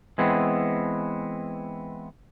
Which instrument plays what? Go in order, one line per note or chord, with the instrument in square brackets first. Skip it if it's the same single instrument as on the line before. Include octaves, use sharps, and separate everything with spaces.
[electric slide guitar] E3 G#3 B3 C4